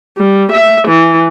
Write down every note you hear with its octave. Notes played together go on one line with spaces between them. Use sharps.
G3
E5
E3